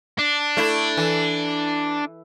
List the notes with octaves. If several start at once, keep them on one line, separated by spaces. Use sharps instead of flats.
D4
A3 E4
E3